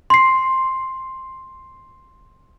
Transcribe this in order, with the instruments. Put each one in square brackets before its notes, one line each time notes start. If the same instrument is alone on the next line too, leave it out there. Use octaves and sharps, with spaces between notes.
[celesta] C6 C7